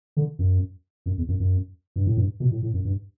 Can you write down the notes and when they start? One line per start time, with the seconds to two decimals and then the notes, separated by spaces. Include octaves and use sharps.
0.17 D3
0.39 F#2
1.06 F#2
1.18 E2
1.28 F#2
1.40 F#2
1.96 G2
2.07 A2
2.17 G2
2.40 B2
2.51 A2
2.62 A2
2.74 F#2
2.85 G2